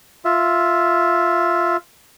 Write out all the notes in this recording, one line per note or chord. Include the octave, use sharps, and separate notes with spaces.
F4 E5